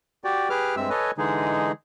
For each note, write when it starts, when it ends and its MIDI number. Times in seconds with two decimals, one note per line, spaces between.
0.24 0.49 66
0.24 0.49 67
0.24 0.49 74
0.24 0.49 79
0.50 0.75 67
0.50 0.75 68
0.50 0.75 71
0.50 0.75 86
0.50 0.75 89
0.77 0.90 43
0.77 0.90 56
0.77 0.90 60
0.77 0.90 76
0.77 0.90 88
0.90 1.11 69
0.90 1.11 71
0.90 1.11 73
0.90 1.11 75
0.90 1.11 80
1.18 1.72 50
1.18 1.72 52
1.18 1.72 56
1.18 1.72 63
1.18 1.72 68